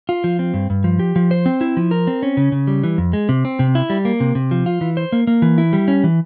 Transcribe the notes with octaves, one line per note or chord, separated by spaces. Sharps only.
F4
F3
C4
G2
G2
F3
G4
F3
C5
C4
E4
F3
A#4
C4
C#4
C#3
C#3
G3
E3
F2
G#3
C3
C4
C3
E4
G3
A#3
C3
C3
F3
F4
E3
C5
A#3
A#3
E3
E4
G3
C#4
E3